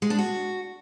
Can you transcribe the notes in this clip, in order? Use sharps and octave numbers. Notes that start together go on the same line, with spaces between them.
G#3
D4
F#4